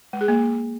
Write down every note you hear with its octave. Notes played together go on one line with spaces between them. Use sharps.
G#3
G#4
A#3